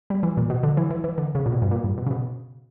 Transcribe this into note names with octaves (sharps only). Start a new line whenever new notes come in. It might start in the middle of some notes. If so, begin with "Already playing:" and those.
G3
E3
A#2
B2
D3
E3
E3
E3
D3
C#3
A#2
B2
G2
A#2
G2
B2
C#3
B2